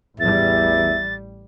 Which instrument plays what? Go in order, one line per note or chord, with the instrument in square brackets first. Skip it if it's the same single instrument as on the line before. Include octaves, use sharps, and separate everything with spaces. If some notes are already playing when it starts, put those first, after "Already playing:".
[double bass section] A1 G3 [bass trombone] E2 [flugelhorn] E5 [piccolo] A6